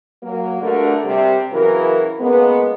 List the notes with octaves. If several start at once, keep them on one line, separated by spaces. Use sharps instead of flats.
F#3 A#3
G2 D3 A3 D4 F#4 A#4
C3 G3
C#3 E3 F#3 A#4
C#3 G#3 A#3 B3